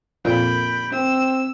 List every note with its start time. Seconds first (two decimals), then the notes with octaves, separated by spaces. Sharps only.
0.25 F2 A#2 G5 B5
0.92 C4 E6